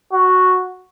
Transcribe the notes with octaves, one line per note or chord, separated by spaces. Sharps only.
F#4